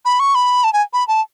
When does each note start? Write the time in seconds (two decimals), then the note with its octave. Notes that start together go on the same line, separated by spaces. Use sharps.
0.05 B5
0.19 C#6
0.35 B5
0.64 A5
0.73 G#5
0.93 B5
1.08 A5